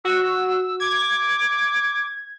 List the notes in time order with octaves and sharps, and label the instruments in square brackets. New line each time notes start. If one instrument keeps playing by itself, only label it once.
[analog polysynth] F#4 [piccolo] E6
[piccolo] D6 [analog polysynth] G#6